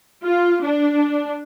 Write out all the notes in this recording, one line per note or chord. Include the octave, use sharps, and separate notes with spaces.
F4
D4